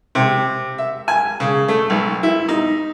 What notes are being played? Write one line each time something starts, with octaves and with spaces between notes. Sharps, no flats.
C3
E5
G#5
C#3
A3
B1
E4
D#4